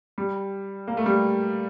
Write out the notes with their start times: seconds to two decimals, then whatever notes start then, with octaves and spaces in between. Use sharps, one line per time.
0.18 G3
0.88 A#3
0.97 A3
1.06 G3